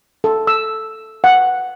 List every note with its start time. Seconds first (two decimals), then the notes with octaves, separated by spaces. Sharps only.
0.24 A4
0.47 E6
1.24 F#5